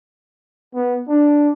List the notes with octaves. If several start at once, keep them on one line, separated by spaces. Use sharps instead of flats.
B3
D4